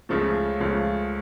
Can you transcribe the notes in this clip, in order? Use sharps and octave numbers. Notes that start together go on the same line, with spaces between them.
C#2 C#3 F3 A3
C#2 C#3 F3 A3